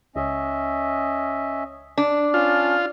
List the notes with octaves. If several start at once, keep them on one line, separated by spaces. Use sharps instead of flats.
C#2 C#4 D#5 E5
D4
C#4 F4 A5